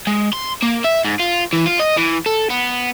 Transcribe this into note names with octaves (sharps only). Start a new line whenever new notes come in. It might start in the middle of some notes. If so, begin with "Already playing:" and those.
G#3
C6
A#3
E5
G#2
F4
E3
F4
D#5
E3
A4
B3